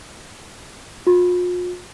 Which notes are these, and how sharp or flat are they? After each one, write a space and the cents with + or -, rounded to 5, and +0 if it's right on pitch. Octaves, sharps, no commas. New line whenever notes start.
F4 +40